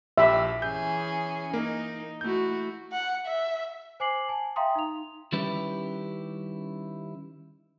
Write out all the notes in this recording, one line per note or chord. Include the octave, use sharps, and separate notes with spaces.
A#1 G4 E5 B5
E3 C#4 G#4 G6
A#3 D#4
A3 E4 F#4 G6
F#5
E5
C5 G#5 D6 C7 F#7
G#5 A5
E5 F5 G5 A#5 C6 D#6
D#4 F7
D#3 G3 C#4 E4 G4 B4